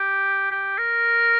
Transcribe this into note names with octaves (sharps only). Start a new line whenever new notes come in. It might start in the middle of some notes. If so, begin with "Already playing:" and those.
Already playing: G4
G4
A#4